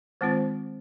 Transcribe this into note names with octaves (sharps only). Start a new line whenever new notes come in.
D#3 G#3 C4 F4 C5